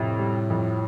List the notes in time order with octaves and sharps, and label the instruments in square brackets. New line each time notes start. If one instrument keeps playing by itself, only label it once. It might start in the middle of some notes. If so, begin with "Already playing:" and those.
Already playing: [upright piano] F2 C3 [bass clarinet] A2
[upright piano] G3
F2